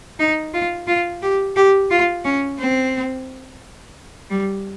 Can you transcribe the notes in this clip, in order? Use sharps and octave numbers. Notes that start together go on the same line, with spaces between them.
D#4
F4
F4
G4
G4
F4
C#4
C4
G3